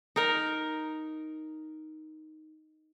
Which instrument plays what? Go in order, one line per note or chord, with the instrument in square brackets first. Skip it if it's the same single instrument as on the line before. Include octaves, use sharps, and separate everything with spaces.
[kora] D#4 A#4